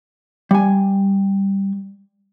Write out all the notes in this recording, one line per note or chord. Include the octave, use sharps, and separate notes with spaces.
G3 G#5